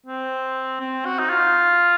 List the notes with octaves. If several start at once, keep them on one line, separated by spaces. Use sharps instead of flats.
C4
C4
F#4
D#4
F4